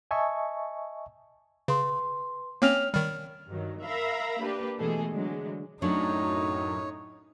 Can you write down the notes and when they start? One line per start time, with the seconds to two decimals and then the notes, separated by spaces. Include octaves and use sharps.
0.11 D#5 E5 G#5 A5 C#6
1.68 C#3 B4 C6
2.62 A#3 C4 C#4 C#5 F6 F7
2.94 D#3 G3 F6
3.49 G2 D#3 F#3
3.83 A#4 E5 F5 A#5 B5
4.42 A#3 D4 G4 B4
4.79 B2 E3 G#3 A3 G#4 A4
5.12 D3 E3 F#3 G#3
5.82 F#2 A2 F#3 D4 D#4 C#5